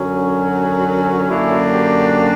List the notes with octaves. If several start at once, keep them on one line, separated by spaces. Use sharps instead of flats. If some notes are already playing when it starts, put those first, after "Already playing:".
Already playing: F#2 D3 F#3 C#4
F#4
F#2 D3 A#3 D4 E4
G4